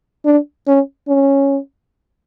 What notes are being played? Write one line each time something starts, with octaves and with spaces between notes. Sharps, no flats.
D4
C#4
C#4